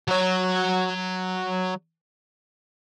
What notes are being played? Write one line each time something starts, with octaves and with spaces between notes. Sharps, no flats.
F#3 C#5